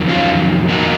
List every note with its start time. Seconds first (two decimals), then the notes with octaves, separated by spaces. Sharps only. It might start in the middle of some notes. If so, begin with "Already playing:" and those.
Already playing: F2 D#3 F#3
0.08 C#4 F4
0.69 F2 D#3 A#3 D#4 F#4